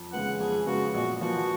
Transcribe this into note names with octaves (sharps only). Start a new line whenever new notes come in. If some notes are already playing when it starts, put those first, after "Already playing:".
Already playing: F2
C#3 G#3 B3 F#5
F2 G#4
C#3 G#3 B3 F#4
A#1 F#4
A#2 F3 B3 F#4